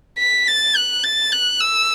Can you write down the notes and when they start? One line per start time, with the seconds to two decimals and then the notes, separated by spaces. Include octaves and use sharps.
0.19 B6
0.48 A6
0.76 F#6
1.04 A6
1.32 F#6
1.61 E6